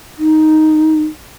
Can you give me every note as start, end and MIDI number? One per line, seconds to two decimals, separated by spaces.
0.18 1.02 63